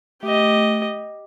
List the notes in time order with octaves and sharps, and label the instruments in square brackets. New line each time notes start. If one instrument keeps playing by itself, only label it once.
[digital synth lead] A3 [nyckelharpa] G4 D#5